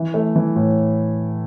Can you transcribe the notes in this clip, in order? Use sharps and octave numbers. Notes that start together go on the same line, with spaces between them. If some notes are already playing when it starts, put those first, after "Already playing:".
Already playing: E3
A3
E3
A2